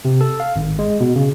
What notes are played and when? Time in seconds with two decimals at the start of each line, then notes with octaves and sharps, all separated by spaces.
0.05 C3
0.21 A4
0.40 F5
0.56 G#1
0.79 G#3
1.00 B2
1.16 C#3